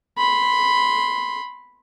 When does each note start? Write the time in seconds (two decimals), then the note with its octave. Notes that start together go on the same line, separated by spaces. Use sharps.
0.18 B5 C6